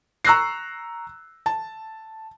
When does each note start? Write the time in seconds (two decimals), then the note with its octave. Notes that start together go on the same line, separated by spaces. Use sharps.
0.25 A#5 C#6 E6 F#6 A#6 C7
1.46 A5